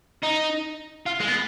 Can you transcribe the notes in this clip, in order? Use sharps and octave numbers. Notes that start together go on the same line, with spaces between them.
D#4
F4
G#3
B3